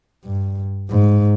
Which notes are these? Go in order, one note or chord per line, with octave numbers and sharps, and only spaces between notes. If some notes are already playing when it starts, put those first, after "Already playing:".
G2
G#2